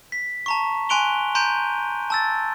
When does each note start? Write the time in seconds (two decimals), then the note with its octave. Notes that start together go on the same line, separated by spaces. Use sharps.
0.12 B6
0.46 A5 A#5 C#6
0.89 G#5 C6 F#6 D7 F7 G7
1.35 A#5 C6 G6 D7 D#7
2.10 A5 E6 A6